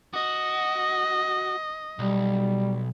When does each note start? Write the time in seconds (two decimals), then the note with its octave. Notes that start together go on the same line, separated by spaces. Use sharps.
0.14 F#4 D#5
1.99 B1 G3